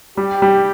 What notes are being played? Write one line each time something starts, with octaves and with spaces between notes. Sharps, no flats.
G3 G4
G3